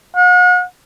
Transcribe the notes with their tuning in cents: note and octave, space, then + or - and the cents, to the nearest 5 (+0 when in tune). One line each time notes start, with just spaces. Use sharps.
F#5 -40